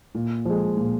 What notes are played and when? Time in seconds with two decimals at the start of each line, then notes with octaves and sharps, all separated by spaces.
0.15 A#2
0.45 F3 G#3
0.77 A#2